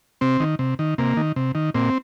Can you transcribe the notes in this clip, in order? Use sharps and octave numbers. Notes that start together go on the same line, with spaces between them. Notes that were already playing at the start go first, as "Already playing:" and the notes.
C3 C4
D#3
C3
D#3
C3 A#3
D#3
C3
D#3
A#2 C4